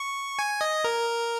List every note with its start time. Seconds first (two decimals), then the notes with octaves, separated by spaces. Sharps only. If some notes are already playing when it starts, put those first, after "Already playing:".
Already playing: C#6
0.39 G#5
0.61 D#5
0.84 A#4